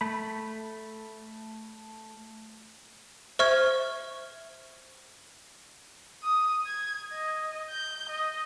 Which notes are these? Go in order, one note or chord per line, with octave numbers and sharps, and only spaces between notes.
A3 B5
C5 E5 C#6 F6 G#6
D#6
G#6
D#5
G6
D#5